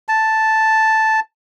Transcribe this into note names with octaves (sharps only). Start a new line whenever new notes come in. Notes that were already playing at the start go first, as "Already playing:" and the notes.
A5